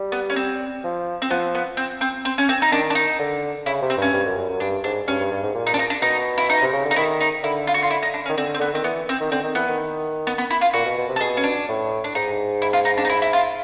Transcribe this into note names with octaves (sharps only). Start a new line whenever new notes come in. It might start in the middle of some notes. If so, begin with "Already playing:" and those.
Already playing: G3
B3
C#4
C4
F3
C4
F3 B3
B3
C4
C4
C4
C#4
C4
D#4
D#3 D4
D4
D#4
D3
C#3 E4
C3
C4
G2 C#4
G2
F#2
F#2
F#2
G2 D4
G#2 D4
G2 C#4
G2
G2
G#2
A#2
D#4
D4
D#4
D4
B2 D#4
E4
D#4
C3
C#3
D3
D#4
D#3 E4
D#4
D3 E4
F4
F#4
F4
E4
D#4
D4
C#4
D#3
D3 C4
C4
D3 B3
D#3 C4
E3 B3
C4
D#3
D3 C4
D#3
E3 B3
D#3
B3
B3
E4
F4
A#2 F#4
B2
B2
C3
A4
B2 G#4
C#4
D4
A2
D4
G#2 D#4
E4
F4
D#4
D4
D#4
E4
E4
F4